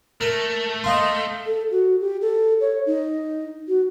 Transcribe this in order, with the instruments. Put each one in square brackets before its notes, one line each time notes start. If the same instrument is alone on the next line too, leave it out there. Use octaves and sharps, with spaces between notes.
[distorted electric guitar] A3 [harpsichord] A#4
[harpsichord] D#5 F5 C6
[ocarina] A4
F#4
G4
A4
C#5
D#4
F#4